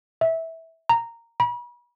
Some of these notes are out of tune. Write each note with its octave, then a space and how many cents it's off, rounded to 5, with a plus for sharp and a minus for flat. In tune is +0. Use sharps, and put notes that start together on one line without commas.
E5 -15
A#5 -10
B5 -40